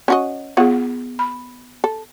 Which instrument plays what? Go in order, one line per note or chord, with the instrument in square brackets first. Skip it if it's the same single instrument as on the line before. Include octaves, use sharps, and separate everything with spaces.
[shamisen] C#4 F#4 D#5
[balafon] B3 G#4 [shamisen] F4 C#5 F#5
[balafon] B5
[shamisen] A4